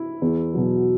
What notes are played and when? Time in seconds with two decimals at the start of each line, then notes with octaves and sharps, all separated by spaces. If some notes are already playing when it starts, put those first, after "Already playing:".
Already playing: E4
0.22 E2
0.54 B2 F#3